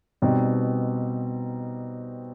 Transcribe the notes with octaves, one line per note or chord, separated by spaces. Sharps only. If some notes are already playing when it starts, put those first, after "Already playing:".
B2 G3 C4 D#4